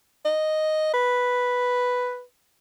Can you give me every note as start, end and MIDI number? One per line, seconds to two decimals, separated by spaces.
0.25 0.93 75
0.93 2.23 71